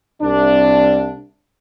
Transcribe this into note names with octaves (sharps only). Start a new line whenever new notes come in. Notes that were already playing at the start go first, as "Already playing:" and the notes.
C2 D4